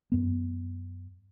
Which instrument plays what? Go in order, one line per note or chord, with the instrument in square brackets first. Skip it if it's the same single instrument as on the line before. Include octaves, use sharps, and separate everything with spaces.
[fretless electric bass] F#2 B3